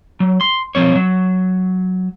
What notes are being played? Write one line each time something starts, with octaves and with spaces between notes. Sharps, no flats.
F#3
C6
B1 G#2 F3 C4 C#5
F#3